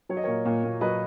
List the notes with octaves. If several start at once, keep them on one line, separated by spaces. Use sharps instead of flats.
F#3 C#5
D#5
A#2 A#4 C#5
A#2
A#2
F#3 B4 D#5